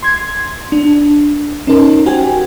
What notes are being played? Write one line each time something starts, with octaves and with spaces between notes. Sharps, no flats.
C6 G#6
D4
C#4 D#4 A#4
F#4 G4 C5 G5 G#5